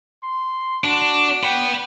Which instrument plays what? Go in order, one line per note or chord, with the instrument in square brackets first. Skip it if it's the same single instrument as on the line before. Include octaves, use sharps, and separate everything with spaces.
[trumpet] C6
[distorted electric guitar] D4 [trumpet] F#4
[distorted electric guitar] F#5 B5 [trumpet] G5